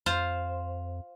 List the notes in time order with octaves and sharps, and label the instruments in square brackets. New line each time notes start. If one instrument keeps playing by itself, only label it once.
[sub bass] F2 [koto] F4 C5